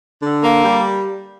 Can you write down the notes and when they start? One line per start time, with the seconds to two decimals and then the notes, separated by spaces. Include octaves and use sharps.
0.22 D3
0.43 A#3
0.64 G3